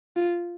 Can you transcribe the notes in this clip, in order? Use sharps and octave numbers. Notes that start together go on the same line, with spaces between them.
F4